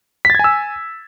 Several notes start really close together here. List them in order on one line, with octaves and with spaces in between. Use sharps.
B6 A6 G#6 G#5 E6